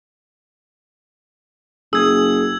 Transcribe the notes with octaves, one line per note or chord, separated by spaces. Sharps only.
F#1 G#4 D#6 E6 G#6